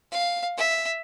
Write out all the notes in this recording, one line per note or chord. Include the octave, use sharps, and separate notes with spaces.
F5
E5